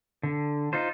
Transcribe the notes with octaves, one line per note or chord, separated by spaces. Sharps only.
D3
D#4 F4 C5